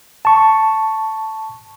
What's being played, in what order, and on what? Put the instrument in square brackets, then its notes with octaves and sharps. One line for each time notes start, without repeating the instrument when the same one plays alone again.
[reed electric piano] A5 C#6